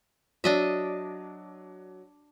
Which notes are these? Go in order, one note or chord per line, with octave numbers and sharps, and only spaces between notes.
F#3 D4 D#5 E5